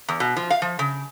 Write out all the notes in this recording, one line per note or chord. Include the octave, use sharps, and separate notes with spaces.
E2
B2
F3
F5
F3
C#3